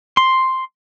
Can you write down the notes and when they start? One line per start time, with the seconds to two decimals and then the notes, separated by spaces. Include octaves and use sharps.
0.17 C6